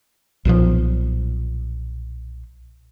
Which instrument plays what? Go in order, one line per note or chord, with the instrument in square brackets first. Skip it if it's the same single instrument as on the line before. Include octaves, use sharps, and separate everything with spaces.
[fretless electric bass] B1 A#2 C#3 F3